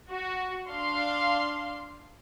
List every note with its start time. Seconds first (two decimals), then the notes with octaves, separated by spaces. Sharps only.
0.10 F#4
0.69 D4 F5 C6